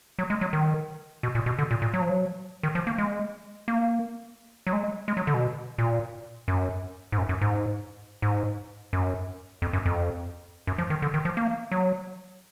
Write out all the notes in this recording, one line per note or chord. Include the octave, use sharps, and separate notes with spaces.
F#3
G#3
F#3
D#3
B2
A#2
B2
D3
A#2
A#2
F#3
F3
F#3
D#3
F3
A#3
G#3
A#3
F#3
G#3
G#3
F#3
D3
B2
A#2
F#2
G#2
F#2
F#2
G#2
G#2
F#2
F2
F#2
F2
F#2
F3
D#3
D3
D#3
F3
A#3
F#3